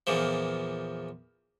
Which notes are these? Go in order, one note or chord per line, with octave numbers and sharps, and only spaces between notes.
E2 A#2 F3